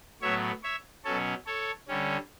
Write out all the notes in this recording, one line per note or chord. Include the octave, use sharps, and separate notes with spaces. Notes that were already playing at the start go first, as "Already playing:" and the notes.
A2 F#3 B3 C#5 E5
C#5 E5
B2 F#3 C#4 A4 C#5
A4 C#5
D3 G3 C#4